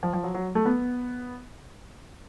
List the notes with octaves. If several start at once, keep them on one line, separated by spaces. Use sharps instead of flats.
F3
F3
F#3
F#3
A3
B3